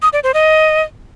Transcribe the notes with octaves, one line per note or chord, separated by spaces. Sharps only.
D#6
D5
C5
D#5